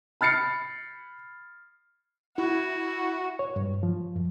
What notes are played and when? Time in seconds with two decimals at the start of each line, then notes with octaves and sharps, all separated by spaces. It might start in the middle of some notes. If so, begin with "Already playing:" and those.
0.21 B5 F6 A6 C7 C#7
2.38 E4 F#4
3.39 C#5
3.56 G2
3.83 F3
4.16 F#2